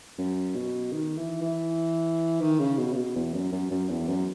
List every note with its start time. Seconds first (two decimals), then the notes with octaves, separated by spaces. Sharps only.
0.18 F#2
0.56 B2
0.92 D#3
1.17 E3
1.42 E3
2.41 D#3
2.60 C#3
2.78 B2
2.93 C#3
2.97 B2
3.16 E2
3.33 F#2
3.52 F#2
3.71 F#2
3.89 E2
4.08 F#2